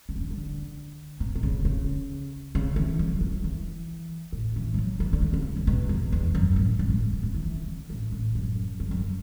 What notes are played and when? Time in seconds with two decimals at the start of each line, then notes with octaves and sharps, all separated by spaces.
0.09 C#3
0.15 B2
0.20 C#3
0.31 D3
1.20 B2
1.35 B2
1.43 C#3
1.65 C#3
2.55 C#3
2.76 E3
2.99 F#3
3.14 E3
3.21 F#3
3.44 E3
4.32 A2
4.56 E3
4.74 E3
4.78 F#3
5.00 E3
5.13 D3
5.22 E3
5.34 C#3
5.56 C#3
5.67 B2
5.89 E2
6.12 E2
6.35 F#2
6.56 A2
6.79 F#2
6.90 G#2
7.01 G#2
7.13 B2
7.23 B2
7.34 E3
7.45 E3
7.68 C#3
7.90 A2
8.12 A2
8.35 F#2
8.80 F#2
8.91 F#2